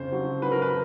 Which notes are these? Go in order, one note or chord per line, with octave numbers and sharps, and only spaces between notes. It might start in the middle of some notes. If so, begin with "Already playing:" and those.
Already playing: F2 C#3 C5
F#3
F#3 B4
A#4
B4